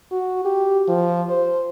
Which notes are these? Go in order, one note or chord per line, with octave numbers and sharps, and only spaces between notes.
F#4
G4
F3
C5